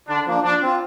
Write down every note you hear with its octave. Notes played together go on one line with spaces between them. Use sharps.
D3 D4
F3 A#3 D4
F3 D4
C4 F4